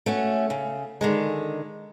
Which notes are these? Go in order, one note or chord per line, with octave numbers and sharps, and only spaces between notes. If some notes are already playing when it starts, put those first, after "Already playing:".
A3 C#4 F#4
C#3
D3 D#3 G#3